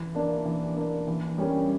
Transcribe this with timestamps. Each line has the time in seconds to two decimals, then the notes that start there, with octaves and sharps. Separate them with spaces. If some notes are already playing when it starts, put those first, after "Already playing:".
Already playing: E3
0.15 A#3 D4
0.46 E3
0.76 A#3 D4
1.08 E3
1.38 G3 C#4 G4 A#4